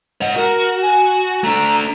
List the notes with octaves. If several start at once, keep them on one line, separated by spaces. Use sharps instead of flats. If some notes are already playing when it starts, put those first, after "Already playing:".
G#2 D#5 F#5
F#4 A#4
G#5
A3 D4 A#5